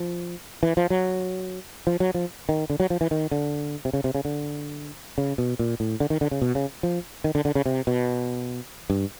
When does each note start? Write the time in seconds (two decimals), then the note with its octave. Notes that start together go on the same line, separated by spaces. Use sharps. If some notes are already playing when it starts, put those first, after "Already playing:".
Already playing: F3
0.63 E3
0.77 F3
0.90 F#3
1.87 F3
2.00 F#3
2.14 F3
2.49 D#3
2.70 D3
2.80 F#3
2.90 F3
3.01 E3
3.11 D#3
3.31 D3
3.85 C3
3.93 C#3
4.04 C3
4.15 C#3
4.25 D3
5.18 C#3
5.38 B2
5.59 A#2
5.80 A2
6.00 D3
6.10 D#3
6.21 D3
6.31 C#3
6.42 B2
6.55 C#3
6.83 F3
7.24 D#3
7.35 D3
7.45 D3
7.55 C#3
7.66 C3
7.87 B2
8.90 G2